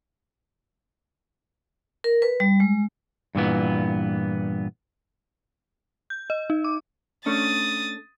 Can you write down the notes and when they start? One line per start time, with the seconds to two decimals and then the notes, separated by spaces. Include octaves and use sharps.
2.04 A#4
2.22 B4
2.40 G3
2.60 G#3
3.35 G2 A#2 E3 B3
6.10 G6
6.30 D#5
6.50 D#4
6.64 D6
7.26 A3 C#4 D4 D#6 A6